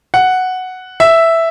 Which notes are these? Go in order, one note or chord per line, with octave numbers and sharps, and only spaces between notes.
F#5
E5